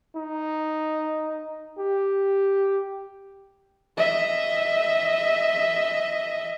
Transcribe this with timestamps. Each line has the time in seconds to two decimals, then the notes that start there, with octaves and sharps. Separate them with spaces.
0.16 D#4
1.78 G4
3.97 D#5 E5